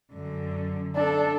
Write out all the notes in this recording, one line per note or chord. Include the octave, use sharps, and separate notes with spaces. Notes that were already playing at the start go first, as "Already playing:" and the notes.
F#2 D3
D4 A4